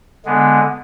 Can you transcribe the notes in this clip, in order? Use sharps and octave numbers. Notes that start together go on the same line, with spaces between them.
D3 G#3 B3